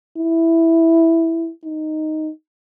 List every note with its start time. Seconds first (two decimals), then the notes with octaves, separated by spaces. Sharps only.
0.18 E4
1.65 D#4